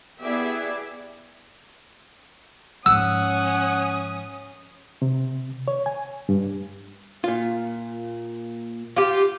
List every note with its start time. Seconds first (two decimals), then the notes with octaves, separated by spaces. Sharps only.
0.21 B3 E4 G4 G#4 D5 E5
2.86 G#2 F3 C#4 F#5 D#6 E6
5.02 C3
5.68 C#5
5.86 G#5
6.29 G2
7.24 A#2 F4
8.96 F4 G4